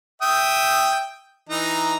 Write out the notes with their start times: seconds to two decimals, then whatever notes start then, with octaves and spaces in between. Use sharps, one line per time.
0.22 E5 G5 D#6
1.49 E3 D#4 A#5